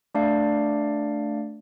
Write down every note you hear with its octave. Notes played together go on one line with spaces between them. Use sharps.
A3 D4 D5 F5